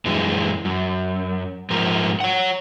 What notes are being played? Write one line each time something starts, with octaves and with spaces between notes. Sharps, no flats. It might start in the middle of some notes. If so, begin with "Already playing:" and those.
F#2 E3 G#3
F#2
G#2 F3 A#4
C#5 F#5